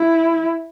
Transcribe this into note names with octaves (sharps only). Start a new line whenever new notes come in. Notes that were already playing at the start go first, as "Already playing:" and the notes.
Already playing: E4